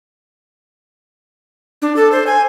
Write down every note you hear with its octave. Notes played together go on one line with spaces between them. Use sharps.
D4
A4
C5
G#5